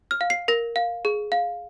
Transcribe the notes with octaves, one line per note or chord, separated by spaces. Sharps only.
F6
F5
C7
A#4 A#6
F5
G#4
F5